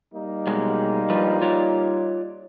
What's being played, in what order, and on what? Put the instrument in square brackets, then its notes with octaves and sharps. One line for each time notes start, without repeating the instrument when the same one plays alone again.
[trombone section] G3 A#3 D#4
[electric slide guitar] B2 F#3 G#3
G2 F3 B4
F4 C#5 D5